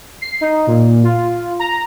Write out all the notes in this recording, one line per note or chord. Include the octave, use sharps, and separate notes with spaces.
C7
D#4
A#2
F4
A#5